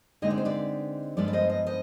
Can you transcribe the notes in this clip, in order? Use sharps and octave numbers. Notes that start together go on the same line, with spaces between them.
D3 G#3 C4 D#4 D#5
D5
C5
B4 D5
G2 F3 G#3 B3 B4 D5
D5
C5 D#5
D#5
C5 D#5